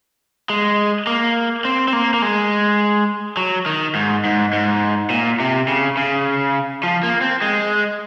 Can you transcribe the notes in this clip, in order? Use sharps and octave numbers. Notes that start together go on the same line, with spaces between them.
G#3
A#3
C4
C4
A#3
A#3
G#3
F#3
D#3
G#2
G#2
G#2
A#2
C3
C#3
C#3
F3
A#3
C4
G#3